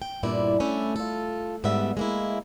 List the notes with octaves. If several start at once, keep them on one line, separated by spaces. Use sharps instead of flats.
G5
E2 G2 A#2 E4 D5
A3 C#4 D4 E4
F4 A4
G#2 G3 B3 F#4 E5
G#3 A#3 E4